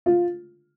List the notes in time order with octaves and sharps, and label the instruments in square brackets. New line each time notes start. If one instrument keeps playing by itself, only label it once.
[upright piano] F4